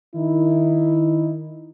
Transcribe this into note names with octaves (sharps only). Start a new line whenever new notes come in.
D#3 D#4 E4